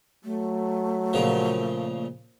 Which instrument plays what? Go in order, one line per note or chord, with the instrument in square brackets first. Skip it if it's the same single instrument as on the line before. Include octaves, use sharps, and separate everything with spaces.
[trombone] F#3 [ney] A3
[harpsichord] A#2 C#3 F3